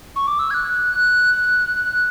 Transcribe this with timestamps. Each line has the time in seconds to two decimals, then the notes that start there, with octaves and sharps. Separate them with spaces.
0.16 C#6
0.27 D6
0.39 E6
0.51 G#6
0.54 F#6